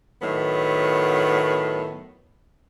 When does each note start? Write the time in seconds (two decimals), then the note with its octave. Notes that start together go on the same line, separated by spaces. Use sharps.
0.22 A2 D#3 F#3 B3